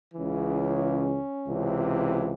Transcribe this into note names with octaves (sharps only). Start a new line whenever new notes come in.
C#2 C#3 E3
C#4
C#2 C3 E3